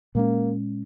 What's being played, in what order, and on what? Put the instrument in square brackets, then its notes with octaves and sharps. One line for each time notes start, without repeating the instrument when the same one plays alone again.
[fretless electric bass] A#2 G#3 C#4 [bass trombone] A#3